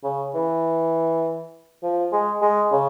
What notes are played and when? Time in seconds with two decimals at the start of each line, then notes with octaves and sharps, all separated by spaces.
0.04 C#3
0.35 E3
1.83 F3
2.12 G#3
2.42 G#3
2.72 C#3